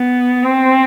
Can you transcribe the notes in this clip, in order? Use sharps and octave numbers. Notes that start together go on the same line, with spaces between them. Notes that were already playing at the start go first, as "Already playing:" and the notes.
Already playing: B3
C4